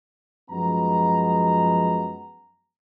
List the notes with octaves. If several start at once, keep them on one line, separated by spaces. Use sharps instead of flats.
F#2 F3 G#3 B3 A#5